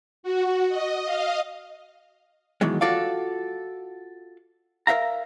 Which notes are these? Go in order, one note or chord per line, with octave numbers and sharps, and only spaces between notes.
F#4
D#5
D#5 F5
B2 D#3 E3 F#3 G#3
F4 F#4 A4 D5 F5
A#4 C5 E5 F5 A#5